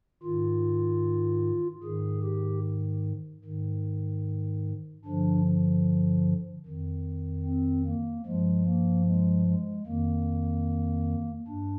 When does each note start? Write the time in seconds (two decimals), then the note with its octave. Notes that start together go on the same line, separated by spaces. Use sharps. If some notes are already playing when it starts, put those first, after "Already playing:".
0.23 G#2 D#3 F4
1.83 G#2 D#3 G#4
2.23 G4
3.44 G#2 D#3
5.05 G2 D3 F3 D4
6.66 F2 D#3
7.46 C4
7.86 A#3
8.26 G2 F3 G#3
8.66 A#3
9.07 G#3
9.47 G#3
9.87 F2 D#3 A#3
11.47 G2 D4